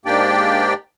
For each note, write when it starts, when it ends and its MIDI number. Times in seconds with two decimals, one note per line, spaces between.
0.06 0.74 44
0.06 0.74 58
0.06 0.74 62
0.06 0.74 67
0.06 0.74 74
0.06 0.74 79